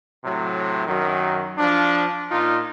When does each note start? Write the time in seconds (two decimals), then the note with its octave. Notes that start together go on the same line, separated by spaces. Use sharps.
0.25 A2 C3 F#3
0.86 F#2 D#3 F#3
1.58 F3 D4
2.31 A#2 D#4 F4